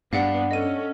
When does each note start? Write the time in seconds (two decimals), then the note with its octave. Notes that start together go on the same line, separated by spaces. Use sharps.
0.13 G2 B3 D4 F5 F#5
0.51 C#4 A4 D#5 D#7